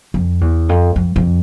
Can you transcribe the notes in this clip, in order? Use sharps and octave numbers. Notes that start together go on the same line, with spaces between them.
F2
E2
F2
F2
F2